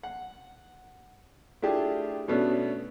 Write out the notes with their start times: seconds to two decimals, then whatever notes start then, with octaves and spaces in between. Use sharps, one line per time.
0.03 F#5
1.62 A3 D4 E4 F4 G4 G#4
2.28 B2 A3 B3 C#4 D4 F#4